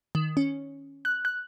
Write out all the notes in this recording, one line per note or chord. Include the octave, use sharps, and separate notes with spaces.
D#3
C#4
F#6
F#6